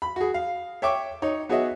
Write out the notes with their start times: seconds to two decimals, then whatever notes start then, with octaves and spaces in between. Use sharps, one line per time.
0.02 B5
0.16 F#4 G#4
0.34 F5
0.82 C#5 E5 G5 C#6 D6
1.22 D#4 C#5
1.49 B3 F#4 G#4 C#5 D#5 E5